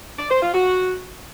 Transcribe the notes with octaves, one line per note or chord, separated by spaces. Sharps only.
D5
C5
F4
F#4